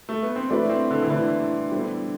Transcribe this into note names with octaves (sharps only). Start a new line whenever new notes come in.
A3
B3
C4
A3 D4 E4 B4
C4
D3
E3
D3 A3 E4 B4
G3 B3 D4 A4 C5